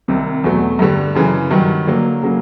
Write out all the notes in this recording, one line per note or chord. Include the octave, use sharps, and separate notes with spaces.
C2 C3 D#3
E2 B2 F#3 A3
G2 D3 G3
F#2 C#3 E3
G2 D#3 F#3
D3 F#3 A#3
C#3 F#3 A#3